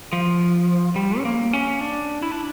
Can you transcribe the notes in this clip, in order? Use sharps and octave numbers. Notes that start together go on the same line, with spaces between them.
F3
G3
C#4
A#3
C#4
D4
E4
D4